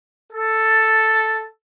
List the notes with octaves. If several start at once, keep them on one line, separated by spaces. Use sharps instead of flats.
A4